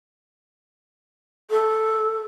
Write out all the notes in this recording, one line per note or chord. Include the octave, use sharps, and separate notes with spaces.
A4